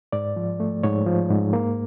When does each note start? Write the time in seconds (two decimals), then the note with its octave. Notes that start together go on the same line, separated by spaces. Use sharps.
0.12 G#2 D5
0.36 F3
0.60 A3
0.83 G#2 C#5
1.06 F3
1.30 G#2
1.53 A#3